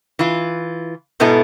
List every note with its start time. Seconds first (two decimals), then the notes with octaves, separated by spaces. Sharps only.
0.19 E3 F4
1.20 G#2 B2 B3 E4 A4